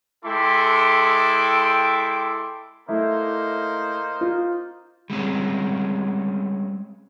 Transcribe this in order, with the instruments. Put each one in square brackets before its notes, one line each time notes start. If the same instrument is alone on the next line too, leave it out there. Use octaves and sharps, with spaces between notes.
[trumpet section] G#3 E4 A4 G5 C6 D6
[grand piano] A3 E4 [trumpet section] A#3 D#4 C5
[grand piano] F4
[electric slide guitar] G3 G#3 C4 C#4